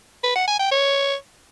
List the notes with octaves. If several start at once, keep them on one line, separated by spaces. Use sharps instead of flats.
B4
F#5
G#5
G5
C#5